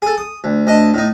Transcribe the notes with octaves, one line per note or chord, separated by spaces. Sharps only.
G#4 A4
D#6
D2
D2 D#5 A5
A2 D#4